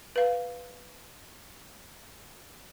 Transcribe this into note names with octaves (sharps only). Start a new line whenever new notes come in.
B4 F5